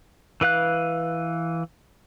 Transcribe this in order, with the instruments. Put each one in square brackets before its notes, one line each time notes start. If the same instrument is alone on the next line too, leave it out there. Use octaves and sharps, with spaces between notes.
[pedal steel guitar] E3 B4 F5 F#6